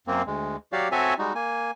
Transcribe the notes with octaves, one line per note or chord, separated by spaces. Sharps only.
F#2 A#3 C4
D2 G#3
F#3 F#4 G4 C#5 D5 F5
C4 F#4 A4 C#5 E5 G#5
G3 G#3 D#4 F#4
A#3 G#5